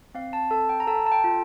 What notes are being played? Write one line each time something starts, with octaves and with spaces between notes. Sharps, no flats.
C4 F5
A5
A4 A5
G5
A#5
A4 A5
A5
G5
F4